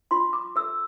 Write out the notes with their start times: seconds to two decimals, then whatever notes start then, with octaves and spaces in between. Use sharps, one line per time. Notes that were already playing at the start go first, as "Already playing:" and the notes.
0.11 F4 C6
0.33 D6
0.56 A4 E6